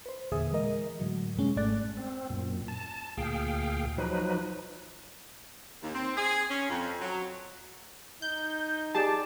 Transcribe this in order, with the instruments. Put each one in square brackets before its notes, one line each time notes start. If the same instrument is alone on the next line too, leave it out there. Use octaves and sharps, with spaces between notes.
[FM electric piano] B4 C5
E2 A#2 D3 G#4 E5 D#6
E3 G#3 A#4 D#5
A2 D3 F#3
F2 B2 G3 G#3 C#4
G#1 G#2 A3 D5 F#6 A6
[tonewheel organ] C4
F#2 A#2
A5
D2 A#2 G#4 F5 G5
F3 F#3 D#4 B4
[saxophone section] D#2
C4
G#4
C#4
F2
F#3
[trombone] D#4 [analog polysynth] G6
[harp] G4 D5 [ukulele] G#4 [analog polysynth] A5